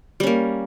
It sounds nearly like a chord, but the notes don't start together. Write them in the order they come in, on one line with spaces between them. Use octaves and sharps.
G3 C#4 A#3